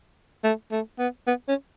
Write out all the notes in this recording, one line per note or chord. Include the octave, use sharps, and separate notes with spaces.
A3
A3
B3
B3
C#4